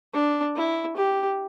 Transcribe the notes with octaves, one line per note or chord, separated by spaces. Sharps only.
D4
E4
G4